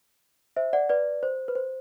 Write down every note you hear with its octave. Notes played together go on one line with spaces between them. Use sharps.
C5 E5
D5 F#5
B4 D5
C5
B4
C5